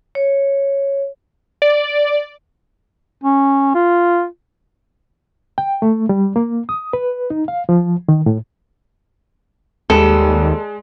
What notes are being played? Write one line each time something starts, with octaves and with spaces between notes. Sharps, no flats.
C#5
D5
C#4
F4
G5
A3
G3
A#3
D#6
B4
D#4
F5
F3
D#3
A2
D#2 G3 G#3 A4